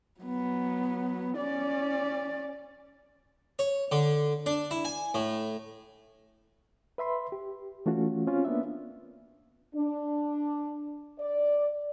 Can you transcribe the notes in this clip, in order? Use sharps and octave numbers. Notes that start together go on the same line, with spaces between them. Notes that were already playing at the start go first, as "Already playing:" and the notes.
F#3 B3
C#4 D5
C#5
D3
D4
E4
G#5
A2
B4 E5 B5 C6
G4
E3 A3 C#4 F4 F#4
C4 C#4 F4
A#3 B3 D4 E5
D4
D5